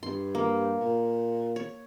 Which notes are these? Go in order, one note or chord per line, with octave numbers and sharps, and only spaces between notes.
G2 C6
A#3
A#2
C#5